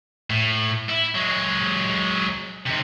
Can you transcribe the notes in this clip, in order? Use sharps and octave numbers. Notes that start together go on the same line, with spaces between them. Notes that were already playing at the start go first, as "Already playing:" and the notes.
A2
E4
F#3 G#3
D#2 C3